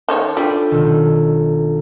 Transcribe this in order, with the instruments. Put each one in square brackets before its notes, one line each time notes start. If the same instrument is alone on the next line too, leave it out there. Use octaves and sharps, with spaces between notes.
[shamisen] D#3 A4 C#5
[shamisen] G3 [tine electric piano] D4 F4 A4 [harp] G6 B6 D#7
[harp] B1 D#3 E6